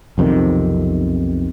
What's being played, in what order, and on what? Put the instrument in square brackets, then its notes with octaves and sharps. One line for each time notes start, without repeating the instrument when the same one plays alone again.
[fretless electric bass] B1 F2 C3 D#3